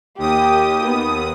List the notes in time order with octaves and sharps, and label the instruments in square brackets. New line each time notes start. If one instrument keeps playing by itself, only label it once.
[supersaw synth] D#2 D#6 [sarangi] G4
[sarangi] B3